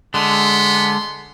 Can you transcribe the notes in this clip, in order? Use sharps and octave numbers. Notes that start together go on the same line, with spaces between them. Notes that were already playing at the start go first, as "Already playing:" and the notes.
D3 G#3 B3 C6